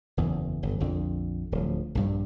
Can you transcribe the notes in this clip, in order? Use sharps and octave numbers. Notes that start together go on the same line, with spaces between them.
F#1 E2
G1
A#1 F2 D3
D1 F3
A#1 G2 G3